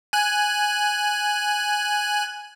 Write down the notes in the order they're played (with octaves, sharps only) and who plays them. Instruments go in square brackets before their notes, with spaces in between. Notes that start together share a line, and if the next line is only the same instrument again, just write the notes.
[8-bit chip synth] G#5 F#6